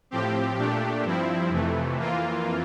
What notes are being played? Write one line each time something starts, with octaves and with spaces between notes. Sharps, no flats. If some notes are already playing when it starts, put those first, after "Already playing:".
A2 F3 C4 G4
A#2 A3 D4 G4
G2 F3 C4 E4
F2 C3 E3 A3
F2 E3 A#3 F4